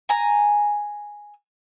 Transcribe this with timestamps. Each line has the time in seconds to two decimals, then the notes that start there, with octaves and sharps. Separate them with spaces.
0.09 G#5 A#5